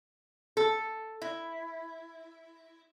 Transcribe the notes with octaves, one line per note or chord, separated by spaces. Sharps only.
A4
E4